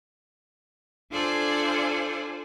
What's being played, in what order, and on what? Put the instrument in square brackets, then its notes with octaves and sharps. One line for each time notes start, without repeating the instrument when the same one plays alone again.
[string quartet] D4 F4 A4 C5 D5 G#5